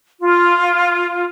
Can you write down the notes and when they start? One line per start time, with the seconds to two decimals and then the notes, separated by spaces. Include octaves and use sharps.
0.21 F4